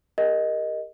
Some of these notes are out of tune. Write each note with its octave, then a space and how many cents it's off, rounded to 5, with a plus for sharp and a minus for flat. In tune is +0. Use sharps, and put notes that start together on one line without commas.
G4 +40 A#4 +0 D#5 +0